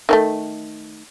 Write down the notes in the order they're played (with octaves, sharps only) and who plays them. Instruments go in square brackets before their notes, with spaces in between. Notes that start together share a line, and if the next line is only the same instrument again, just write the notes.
[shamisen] D#3 F#3 A3